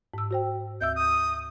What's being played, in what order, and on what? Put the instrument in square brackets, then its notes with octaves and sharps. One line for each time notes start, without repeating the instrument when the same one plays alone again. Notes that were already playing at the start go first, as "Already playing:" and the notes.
[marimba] G#2 E6
F#4 C5 G5
[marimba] D2 E5 E6 [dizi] G6
[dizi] D#6